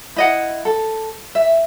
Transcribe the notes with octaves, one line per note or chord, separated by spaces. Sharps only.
E4 D#5 F#5
A4
E5